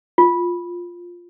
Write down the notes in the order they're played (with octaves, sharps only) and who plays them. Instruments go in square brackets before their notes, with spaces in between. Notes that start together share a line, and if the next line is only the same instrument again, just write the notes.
[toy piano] F4